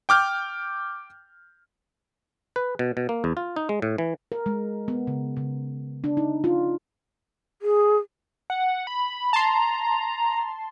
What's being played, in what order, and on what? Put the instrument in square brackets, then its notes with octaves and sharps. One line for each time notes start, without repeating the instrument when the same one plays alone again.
[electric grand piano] G5 D6 F6 G6
[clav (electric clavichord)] B4
B2
B2
A#3
E2
F4
D#4
G#3
A2
E3
[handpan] A#4
G#3
B3
C#3
C#3
D4
D#4
F4
[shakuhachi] G#4
[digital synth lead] F#5
B5
[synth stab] A5 C6 [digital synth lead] A#5